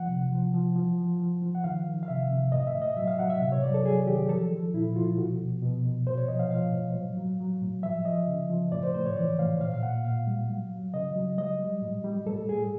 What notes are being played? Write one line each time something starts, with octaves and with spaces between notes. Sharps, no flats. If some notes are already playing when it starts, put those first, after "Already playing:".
Already playing: F3 F#5
C3
F3
F3
F3
F3
F3
F3
F#5
D#3 F5
D#3
F5
C3 E5
C3
A2 D#5
E5
A2
D#5
F#3 E5
F5
F#3 F#5
E5
C3
C#5
F#3 D5
A4
F#3 G#4
D#3 G4
F3 A4
F3
A#2 E4
F3 F4
B2 F#4
B2
B2
B2
A2 C5
C#5
F3 D#5
F5
F3 F5
A2
F#3
F#3
F#3
A2
F3 E5
F3 D#5
C#3
F3
A2 D5
C5
A2 C5
C#5
E3 D5
A2 F5
A#2 F5
F5
A#2 F#5
A#2 F5
G3
F#3
F#3
C#3 D#5
F#3
G3 D#5
G3
A2
G3
A2 A4
A2 G#4